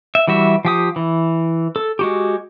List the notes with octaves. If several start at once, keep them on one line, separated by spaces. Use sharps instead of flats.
E5
E3 G3 F#4 E5
F3 G4 D#6
E3
A4
G#3 F#4 G4